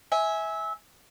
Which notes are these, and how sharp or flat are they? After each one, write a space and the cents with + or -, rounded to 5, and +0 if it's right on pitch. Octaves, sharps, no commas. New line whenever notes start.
E5 -20 G#5 +0